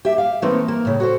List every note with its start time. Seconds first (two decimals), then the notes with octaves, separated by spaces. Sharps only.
0.05 G4 E5
0.18 F5
0.42 E3 A3 A#3 C4 D#4
0.68 A#3
0.85 A2 C#3
1.00 F#4 A4 C5